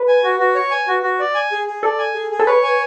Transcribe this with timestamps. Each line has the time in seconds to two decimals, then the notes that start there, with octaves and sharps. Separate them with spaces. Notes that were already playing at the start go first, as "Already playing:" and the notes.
Already playing: B4
0.08 G#5
0.23 F#4
0.39 F#4
0.55 C#5
0.71 G#5
0.88 F#4
1.03 F#4
1.20 D5
1.35 G#5
1.52 G#4
1.67 G#4
1.83 A4 D5
1.99 G#5
2.15 G#4
2.31 G#4
2.39 A4
2.47 B4 C#5
2.63 G#5